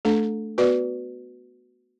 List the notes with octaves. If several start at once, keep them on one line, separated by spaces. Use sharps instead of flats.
A3 D4 A4
B3 F#4 B4 D5